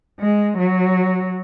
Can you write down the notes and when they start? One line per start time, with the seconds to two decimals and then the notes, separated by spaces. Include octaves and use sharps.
0.20 G#3
0.58 F#3